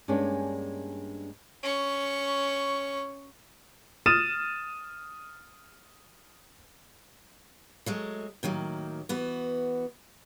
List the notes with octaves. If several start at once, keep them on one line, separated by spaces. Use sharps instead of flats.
G2 G#3 A#3 C#4 D4
C#4 C#6
D#6 F6 A6 D#7 E7
F#3 G#3 A3
A2 D#3 F#3 A#3
E3 B3 F#4